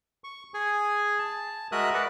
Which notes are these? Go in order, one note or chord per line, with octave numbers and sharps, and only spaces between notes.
C#6
G#4 G#5
A5
G#3 F#4 A#4 E5 D#6 F#6
B4 D5 F#5